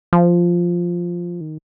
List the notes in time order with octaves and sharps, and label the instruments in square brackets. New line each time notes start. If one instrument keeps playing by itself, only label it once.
[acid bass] F3
D#3